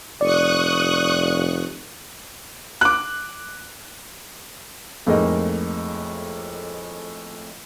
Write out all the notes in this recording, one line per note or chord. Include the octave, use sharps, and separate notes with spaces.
F1 D5 C#6 D#6 F#6
D6 F#6
F2 A2 G#3 A#3 D#4